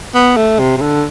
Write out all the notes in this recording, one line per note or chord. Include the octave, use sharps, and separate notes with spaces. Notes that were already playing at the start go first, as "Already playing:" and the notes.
B3
A3
C3
C3
D3